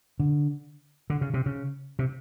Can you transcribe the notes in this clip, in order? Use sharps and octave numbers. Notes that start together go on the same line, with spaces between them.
D3
D3
C#3
C3
C#3
C3